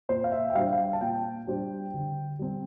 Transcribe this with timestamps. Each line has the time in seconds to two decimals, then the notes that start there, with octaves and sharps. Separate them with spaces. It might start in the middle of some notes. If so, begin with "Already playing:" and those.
0.09 A#2 C5
0.24 F5
0.32 E5
0.50 G5
0.55 G3 D4 G4 C5 F5
0.73 F5
0.78 G5
0.93 A5
1.01 A#2 G5
1.47 G3 D4 G4 C5
1.94 D3
2.39 G3 C4